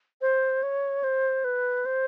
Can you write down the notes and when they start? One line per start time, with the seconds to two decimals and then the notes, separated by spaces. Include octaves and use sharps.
0.21 C5
0.63 C#5
1.04 C5
1.44 B4
1.86 C5